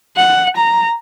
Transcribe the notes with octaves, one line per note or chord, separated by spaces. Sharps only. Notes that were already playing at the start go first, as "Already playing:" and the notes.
F#5
A#5